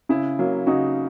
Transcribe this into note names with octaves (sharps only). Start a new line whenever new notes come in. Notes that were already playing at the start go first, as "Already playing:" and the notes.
C#3 E4
F#3 A#3
C#3 D#4 F#4